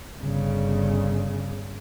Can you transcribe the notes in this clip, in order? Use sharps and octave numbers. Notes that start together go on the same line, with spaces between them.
G1 C#3